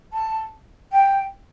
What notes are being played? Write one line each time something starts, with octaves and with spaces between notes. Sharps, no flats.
A5
G5